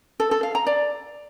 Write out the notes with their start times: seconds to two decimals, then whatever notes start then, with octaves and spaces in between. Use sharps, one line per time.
0.20 A4
0.31 A4
0.43 F5
0.55 A#5
0.67 D5